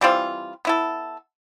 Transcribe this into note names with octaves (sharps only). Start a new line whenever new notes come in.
E3 G3 C4 F4
B3 E4 A4